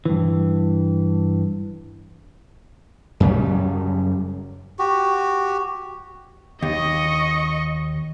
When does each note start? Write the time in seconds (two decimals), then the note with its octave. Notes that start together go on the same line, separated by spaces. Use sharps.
0.05 G2 E3
3.20 F#2 C#3 F#3 G3
4.79 F#4 G4
6.62 D#2 D#5 C#6